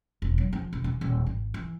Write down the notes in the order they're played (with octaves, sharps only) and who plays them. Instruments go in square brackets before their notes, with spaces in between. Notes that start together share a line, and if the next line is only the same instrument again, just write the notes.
[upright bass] E1
F#3
F3
E1
E3
D#1
G#1
E3